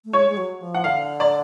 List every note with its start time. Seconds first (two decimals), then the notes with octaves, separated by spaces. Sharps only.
0.05 A3
0.13 G#3 C#5
0.29 G#3
0.37 F#3
0.61 F3
0.75 F#5
0.84 D3 F5
1.20 D5